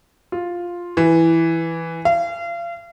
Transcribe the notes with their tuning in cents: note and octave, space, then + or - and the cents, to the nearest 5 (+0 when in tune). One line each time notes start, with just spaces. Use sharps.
F4 +5
E3 +0
F5 -35